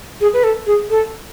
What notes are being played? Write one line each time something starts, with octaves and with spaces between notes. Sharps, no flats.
G#4
B4
A4
G#4
A4